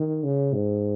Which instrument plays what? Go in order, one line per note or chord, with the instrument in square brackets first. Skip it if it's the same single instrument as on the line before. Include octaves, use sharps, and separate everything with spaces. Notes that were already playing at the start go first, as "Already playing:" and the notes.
Already playing: [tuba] D#3
C#3
G#2